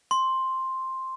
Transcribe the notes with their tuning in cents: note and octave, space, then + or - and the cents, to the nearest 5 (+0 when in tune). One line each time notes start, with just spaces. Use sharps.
C6 +5